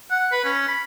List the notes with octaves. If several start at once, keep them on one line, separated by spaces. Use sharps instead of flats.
F#5
B4
C#4
B5